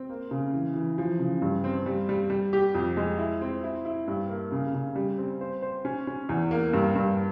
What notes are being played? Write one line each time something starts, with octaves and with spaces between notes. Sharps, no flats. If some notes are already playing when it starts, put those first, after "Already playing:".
Already playing: C4
A#3
C#3
E3
E3
F3
C#3
G2
C4
G3
G3
G3
G4
F2
G#3
E4
C4
E4
E4
G2
A#3
C#3
C#3
G3
C4
C5
C5
C#4
C#4
E2
A#3
G2
G2